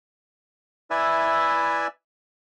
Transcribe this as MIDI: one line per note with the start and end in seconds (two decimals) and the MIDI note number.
0.91 1.87 64
0.91 1.87 71
0.91 1.87 74
0.91 1.87 76
0.91 1.87 80
0.91 1.87 88